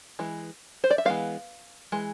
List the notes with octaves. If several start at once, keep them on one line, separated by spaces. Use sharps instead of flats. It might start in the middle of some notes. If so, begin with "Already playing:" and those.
E3 G#3
C5
D5
E5
E3 G#3 B3 F5
E3 G#3